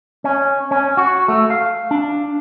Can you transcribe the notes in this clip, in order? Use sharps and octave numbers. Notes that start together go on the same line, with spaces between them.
C#4
C#4
F#4
A3
F5
D4